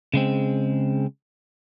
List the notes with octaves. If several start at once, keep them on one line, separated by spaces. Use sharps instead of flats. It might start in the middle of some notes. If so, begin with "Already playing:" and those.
C#3 G#3 C4